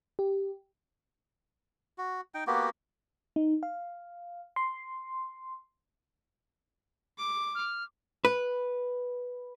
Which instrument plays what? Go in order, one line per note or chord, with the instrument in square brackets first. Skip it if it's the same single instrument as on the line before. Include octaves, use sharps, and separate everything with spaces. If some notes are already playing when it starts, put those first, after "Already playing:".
[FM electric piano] G4
[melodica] F#4
D#4 G5
A#3 B3 F#4 G4
[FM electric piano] D#4
F5
C6
[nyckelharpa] D6
[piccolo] F6
[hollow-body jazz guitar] B4